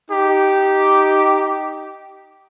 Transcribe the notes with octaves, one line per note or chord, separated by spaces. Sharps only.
D#4 G4